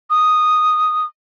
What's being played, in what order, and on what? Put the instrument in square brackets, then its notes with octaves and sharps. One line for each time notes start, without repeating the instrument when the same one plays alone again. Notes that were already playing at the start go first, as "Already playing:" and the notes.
[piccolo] D#6